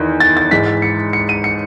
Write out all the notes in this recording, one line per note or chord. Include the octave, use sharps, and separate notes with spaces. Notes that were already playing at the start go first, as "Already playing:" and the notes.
Already playing: E2 D#3
A6
A6
G#2 E3 G#3 B6
C#7
C#7
D#7
C#7